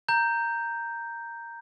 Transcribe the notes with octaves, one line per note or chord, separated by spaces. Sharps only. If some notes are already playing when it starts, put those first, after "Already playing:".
A#5 G6